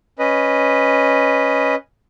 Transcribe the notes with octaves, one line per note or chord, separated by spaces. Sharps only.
C#4 B4 D#5